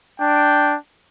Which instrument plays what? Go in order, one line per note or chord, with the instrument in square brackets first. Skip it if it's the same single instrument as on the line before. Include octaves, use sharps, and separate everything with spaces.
[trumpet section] D4 G5